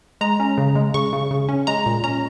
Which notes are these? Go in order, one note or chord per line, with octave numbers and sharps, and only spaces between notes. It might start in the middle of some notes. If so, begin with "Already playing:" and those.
G#3 A#5
C#4
C#3
G#3
C#3 C#6
C#3
C#3
C#4
G#3 A#5
A#2
C#4 A#5